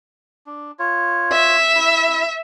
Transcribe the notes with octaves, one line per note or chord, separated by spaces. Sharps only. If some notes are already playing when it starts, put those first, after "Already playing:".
D4
F4 C#5
E5
E4